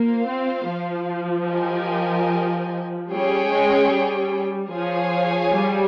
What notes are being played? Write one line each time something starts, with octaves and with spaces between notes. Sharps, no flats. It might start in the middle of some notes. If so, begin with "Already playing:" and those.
Already playing: A#3 F4 C5 F5
C4
F3
G4 A#4 D#5 G#5
G3 C#4 G#4 C#5 G5
G#3
G3
F3 G#4 C#5 F5 G#5
G3